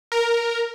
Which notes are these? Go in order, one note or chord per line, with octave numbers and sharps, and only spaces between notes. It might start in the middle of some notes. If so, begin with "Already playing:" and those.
A#4